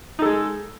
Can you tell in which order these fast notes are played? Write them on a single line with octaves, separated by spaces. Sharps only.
D#4 A4 G#3